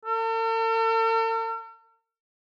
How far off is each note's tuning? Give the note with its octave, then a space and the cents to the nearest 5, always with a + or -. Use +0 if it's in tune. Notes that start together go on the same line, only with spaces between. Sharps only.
A4 +45